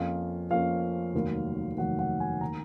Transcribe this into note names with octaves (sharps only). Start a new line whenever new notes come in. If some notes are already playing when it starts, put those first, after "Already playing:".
Already playing: F2 F3 A#3 C#4 F5
F2 F3 A#3 C#4 F5
F1 D#2 D#3 F#3
F1 D#2 D#3 F#3 F#5
F#5
G#5
D#3 A#3 A#5